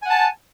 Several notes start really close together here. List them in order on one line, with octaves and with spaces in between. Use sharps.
G#5 F#5 A5